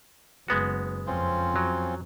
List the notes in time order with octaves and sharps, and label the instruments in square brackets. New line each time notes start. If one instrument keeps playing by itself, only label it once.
[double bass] F#1 [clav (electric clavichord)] G#3 B3 F#4
[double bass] F2 [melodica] C4 C#4 F4
[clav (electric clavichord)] F#3